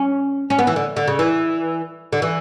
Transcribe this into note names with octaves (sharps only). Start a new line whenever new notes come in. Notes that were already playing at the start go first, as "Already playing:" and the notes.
Already playing: C#4
C#4
B3
E3
D3
D3
C#3
E3
D3
E3